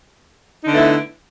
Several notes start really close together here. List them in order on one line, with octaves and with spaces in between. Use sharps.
D#4 D3 B3 A3 E4